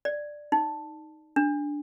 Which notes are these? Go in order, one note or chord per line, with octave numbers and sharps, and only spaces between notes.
D5
D#4
D4